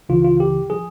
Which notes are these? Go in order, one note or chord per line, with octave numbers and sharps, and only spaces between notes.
C#2 C#3 E3 F4
F4
G4
F3 G#4